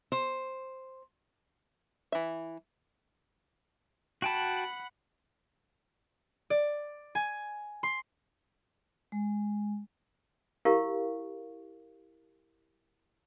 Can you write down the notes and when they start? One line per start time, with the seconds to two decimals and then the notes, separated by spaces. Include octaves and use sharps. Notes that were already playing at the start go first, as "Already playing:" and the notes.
0.12 C5
2.12 E3 E5
4.22 F#4 F#5 G5 A5 B5
6.50 D5
7.15 G#5
7.83 C6
9.12 G#3
10.65 E4 G4 A#4 F5 C#6